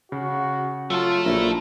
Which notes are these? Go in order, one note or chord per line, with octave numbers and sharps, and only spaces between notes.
C#3 F#4
F#3 A3 F4 A4
A#1 E4 A#4